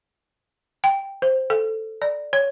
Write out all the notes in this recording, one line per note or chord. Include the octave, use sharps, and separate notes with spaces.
G5
C5
A4
D5
C#5